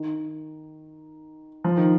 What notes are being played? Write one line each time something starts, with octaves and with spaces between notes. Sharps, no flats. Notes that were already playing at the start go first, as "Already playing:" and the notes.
Already playing: D#3
F3
D#3